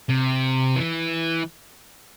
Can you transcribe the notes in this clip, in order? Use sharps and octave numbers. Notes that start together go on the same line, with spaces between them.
C3
E3